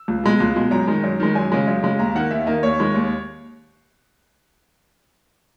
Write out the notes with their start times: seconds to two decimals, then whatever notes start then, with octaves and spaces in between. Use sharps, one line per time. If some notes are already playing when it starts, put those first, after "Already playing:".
Already playing: E6
0.08 C#2
0.24 B2 G#3
0.40 C#2
0.56 B2 G#3
0.71 F#2 A#5
0.87 D#3 G#3
1.03 F#2
1.20 D#3 G#3
1.35 F#2 G#5
1.52 C#3 G#3
1.68 F#2
1.83 C#3 G#3
1.99 D#2 A#5
2.15 D#3 A#3 F#5
2.31 D#2 E5
2.47 D#3 A#3 D#5
2.63 D#2 C#5
2.79 D#3 G#3
2.94 D#2